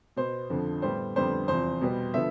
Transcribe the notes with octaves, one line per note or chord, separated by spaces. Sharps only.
B2 B3 C5
F2 D3 F3
A2 G3 B3 C5
F2 D3 G3 B3 C5
E2 C3 F3 C5
B2 G3 B3
D3 F3 B3 E5